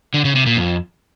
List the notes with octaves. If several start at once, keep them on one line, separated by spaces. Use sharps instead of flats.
D3
C#3
C3
A#2
F2